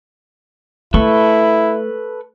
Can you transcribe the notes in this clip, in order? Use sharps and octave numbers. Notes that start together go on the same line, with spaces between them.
A3 E4 A4 B4 C#6